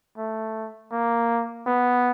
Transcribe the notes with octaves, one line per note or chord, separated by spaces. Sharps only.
A3
A#3
B3